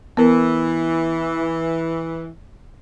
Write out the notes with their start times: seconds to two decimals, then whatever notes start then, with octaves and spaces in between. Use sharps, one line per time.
0.17 E3 B3 A#4